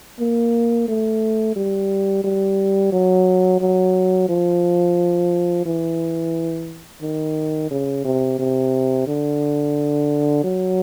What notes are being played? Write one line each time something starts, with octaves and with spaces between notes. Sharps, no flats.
A#3
A3
G3
G3
F#3
F#3
F3
E3
D#3
C#3
C3
C3
D3
F#3